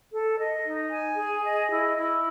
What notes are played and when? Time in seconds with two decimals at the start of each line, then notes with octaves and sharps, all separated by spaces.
0.12 A4
0.39 D#5
0.66 D#4
0.91 G#5
1.18 G#4
1.44 D#5
1.71 E4
1.97 E4